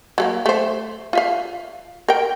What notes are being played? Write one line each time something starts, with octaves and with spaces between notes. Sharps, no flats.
F#3 A3 A#3
A3 C5
F4 E5 F5
A#4 G5